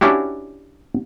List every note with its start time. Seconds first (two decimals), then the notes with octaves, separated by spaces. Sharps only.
0.01 C#4 D4 E4 F#4 G4